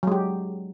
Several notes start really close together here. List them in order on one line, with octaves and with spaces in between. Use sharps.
F#3 G#3 G4